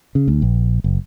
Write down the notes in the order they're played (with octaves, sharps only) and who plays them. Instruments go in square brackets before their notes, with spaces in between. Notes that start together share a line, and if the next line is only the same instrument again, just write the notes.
[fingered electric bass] C#3
D2
A#1
F#1